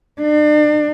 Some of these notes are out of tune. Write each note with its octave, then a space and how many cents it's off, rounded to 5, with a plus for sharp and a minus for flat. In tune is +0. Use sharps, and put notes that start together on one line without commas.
D4 +40